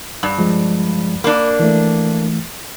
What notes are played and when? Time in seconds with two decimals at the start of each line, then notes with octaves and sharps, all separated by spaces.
0.23 G2
0.38 F3 G#3
1.24 A#3 D4 B5
1.60 E3 A3